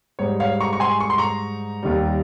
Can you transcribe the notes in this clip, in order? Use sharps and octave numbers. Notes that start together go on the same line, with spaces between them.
G#2 G3 C#5
C#5 F5
A#5 C#6
C#6
G#5 C6
C#6
C6
A#5 C#6
D#2 D#3 G3